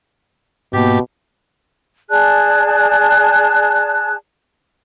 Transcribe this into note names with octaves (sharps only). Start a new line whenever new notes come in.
G#2 B2 A#3 G4
G#4 D5 A5 F#6